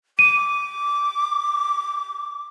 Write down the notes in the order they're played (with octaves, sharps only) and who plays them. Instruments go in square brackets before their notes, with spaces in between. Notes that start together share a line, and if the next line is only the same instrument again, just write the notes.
[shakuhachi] D6 [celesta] D#7